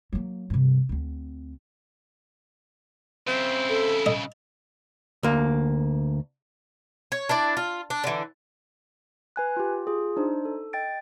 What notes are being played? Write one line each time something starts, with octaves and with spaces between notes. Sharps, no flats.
F#3 A#3
G2 C3
D2 C4
C#3 C4 E4
A4
D#5
D2 A#3
C#5
D4 E4 D5
F4
D4
D3 E3
B4 G#5 F#6
F4 G4
F4 G#4
D4 D#4 C5
A4
D#5 G5 A6 D7